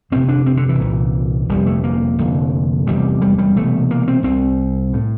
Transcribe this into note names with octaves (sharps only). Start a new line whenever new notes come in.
G1 F2 C3 C4
D4
C4
D3
E3
C2 A#2
G1 F2 C3 G3
A3
A#3
F1 F2 D3
F1 E2 C3 G3
G3
G3
E1 E2 C3 A3
A#3
C4
C2 C3 C4
A2